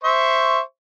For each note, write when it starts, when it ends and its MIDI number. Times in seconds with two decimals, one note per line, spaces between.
0.04 0.60 72
0.04 0.60 76
0.04 0.60 85